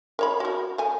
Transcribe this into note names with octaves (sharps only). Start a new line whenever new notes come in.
A#4 C#5 B5
F#4 A#4
A3 G#5